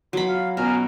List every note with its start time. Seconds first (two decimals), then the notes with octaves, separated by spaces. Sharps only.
0.13 F#3 B5 C6
0.28 F5
0.57 B2 C#4 A#5 F6